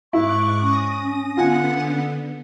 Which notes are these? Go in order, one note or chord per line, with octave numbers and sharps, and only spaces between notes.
G#2 E4 C#6 D6 F#6
C#4 D#6 A#6
D3 B3 F4 F#5 G#5